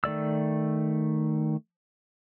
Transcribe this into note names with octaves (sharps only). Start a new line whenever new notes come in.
D#3 A3 D5 E6